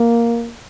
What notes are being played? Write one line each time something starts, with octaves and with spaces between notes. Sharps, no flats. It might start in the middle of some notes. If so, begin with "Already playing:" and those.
Already playing: A#3